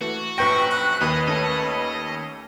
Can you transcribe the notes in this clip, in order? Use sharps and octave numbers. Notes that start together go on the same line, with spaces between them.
E3 A3 F#4
A#1 F#2 B4 G5 C#6 G6 A#6
F#6
D#2 B4 D#5
A3 C#4 A4 D#5